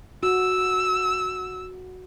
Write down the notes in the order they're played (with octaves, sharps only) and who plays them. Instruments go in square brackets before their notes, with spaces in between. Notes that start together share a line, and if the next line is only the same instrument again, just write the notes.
[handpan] F#4 [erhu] E6